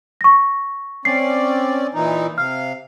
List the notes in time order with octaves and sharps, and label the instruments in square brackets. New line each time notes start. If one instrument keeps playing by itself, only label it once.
[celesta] C#6 A#6
[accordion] C4 C#4 D5 [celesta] C7
[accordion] A#2 E3 D#4
[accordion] C3 F5 [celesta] F6